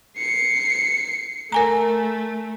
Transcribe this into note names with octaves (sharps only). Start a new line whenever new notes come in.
C7 C#7
A3 A#4 G#5 A#5